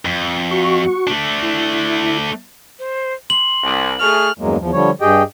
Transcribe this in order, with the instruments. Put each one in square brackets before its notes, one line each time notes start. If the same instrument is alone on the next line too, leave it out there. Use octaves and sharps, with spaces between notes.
[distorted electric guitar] F2
[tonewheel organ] F#4 C#6
[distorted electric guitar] A3 D4
[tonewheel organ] E4
[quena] C5
[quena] C6 [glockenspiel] F#7
[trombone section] C2
[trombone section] A3 G#4 [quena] C#6 [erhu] F6
[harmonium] E2 G2 F#3 G#3 A#3
E2 F3
D3 F3 G3 C#5
G2 G4 G#4 D#5 G5